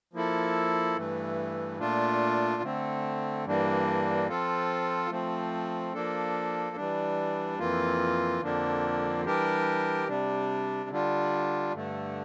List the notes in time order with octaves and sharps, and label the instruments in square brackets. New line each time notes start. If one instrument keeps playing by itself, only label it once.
[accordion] F3 A#3 E4 A4
G2 E3 A3
A#2 A3 D4 F4
D3 A3 C4
G2 E3 G3 A#3 D4
F3 C4 F4 A4
F3 A3 C4
F3 A#3 D4 A4
E3 G3 D4
F2 E3 A#3 F4
F2 D3 F3 A#3 D4
E3 G3 D4 G4 A#4
C3 G3 D4
D3 G3 D4 F4
G2 D3 A3